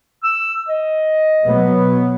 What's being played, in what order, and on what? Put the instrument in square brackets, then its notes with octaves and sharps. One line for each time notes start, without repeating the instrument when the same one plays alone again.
[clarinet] E6
D#5
[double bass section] B2 F#3 B3